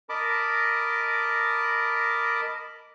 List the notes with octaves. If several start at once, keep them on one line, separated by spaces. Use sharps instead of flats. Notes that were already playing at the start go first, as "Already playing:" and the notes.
A#4 D#5 A5 B5 D6